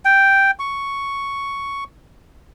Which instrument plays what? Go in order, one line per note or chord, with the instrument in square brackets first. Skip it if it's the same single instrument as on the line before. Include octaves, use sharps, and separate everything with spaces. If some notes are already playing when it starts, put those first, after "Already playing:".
[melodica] G5
C#6